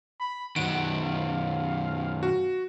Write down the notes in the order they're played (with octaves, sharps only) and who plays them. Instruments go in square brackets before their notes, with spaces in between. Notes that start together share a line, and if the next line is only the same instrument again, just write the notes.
[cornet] B5
[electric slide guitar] F#2 D#3 [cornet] F#5 [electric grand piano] D7
[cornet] F5
[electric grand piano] F#4